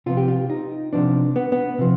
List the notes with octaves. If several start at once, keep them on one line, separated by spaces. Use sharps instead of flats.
C3 F3 B3 F4
G4
F4
D#4
C3 F3 B3 D4
B3
B3
C3 F3